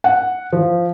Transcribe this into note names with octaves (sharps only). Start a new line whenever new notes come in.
F#5
F3